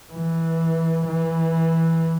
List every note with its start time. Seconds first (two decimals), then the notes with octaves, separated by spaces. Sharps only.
0.13 E3
1.07 E3